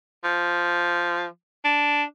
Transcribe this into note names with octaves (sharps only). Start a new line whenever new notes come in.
F3
D4